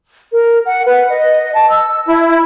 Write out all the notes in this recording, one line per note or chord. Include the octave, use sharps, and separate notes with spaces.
A#4
F#5
B4
D#5
A5
E6
E4